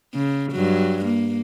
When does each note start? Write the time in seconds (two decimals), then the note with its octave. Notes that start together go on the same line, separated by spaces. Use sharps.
0.14 C#3
0.52 G2 F#3
1.05 A#3